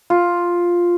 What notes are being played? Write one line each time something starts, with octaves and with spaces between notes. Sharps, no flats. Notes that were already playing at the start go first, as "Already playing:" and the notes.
F4